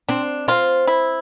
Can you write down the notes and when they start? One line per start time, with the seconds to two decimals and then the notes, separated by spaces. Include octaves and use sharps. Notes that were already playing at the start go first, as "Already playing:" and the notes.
0.08 C4 D4
0.48 C4 F4
0.87 E4